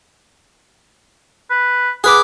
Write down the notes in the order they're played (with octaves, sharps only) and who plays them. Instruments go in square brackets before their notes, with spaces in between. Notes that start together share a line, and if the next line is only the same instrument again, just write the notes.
[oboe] B4
[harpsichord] G#4 B4 D6 [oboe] F#5